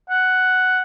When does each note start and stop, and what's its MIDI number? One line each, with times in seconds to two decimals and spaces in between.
0.10 0.83 78